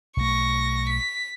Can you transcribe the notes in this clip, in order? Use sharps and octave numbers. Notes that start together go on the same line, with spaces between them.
B1 A3 C#6 A#6
B6